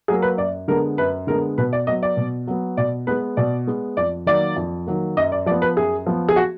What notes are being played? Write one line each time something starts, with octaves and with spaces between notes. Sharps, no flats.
F#3 A#3 G#4
B4
F#2 D5
D3 G#3 B3 A#4
F#2 B4
D3 G#3 B3 A#4
B2 B4
D5
F#3 B3 D#5
D5
B2
F#3 B3
B2 D5
G#3 B3 B4
B2 D5
G#3 B3
F2 D5
D#3 F#3 A#3 D5
F2
D#3 F#3 A#3
F#2 D#5
D5
F3 B3 D5
B4
F#2 G#4
F3 B3
G#4
F#4